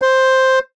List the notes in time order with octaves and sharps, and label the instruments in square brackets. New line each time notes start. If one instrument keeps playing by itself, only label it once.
[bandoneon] C5